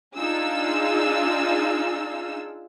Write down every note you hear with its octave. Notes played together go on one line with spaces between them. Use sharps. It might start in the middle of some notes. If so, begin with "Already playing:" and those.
D4 D#4 F4 G#4 E6